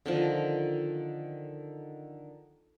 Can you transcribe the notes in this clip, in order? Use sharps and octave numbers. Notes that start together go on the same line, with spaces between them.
D3 D#3 F3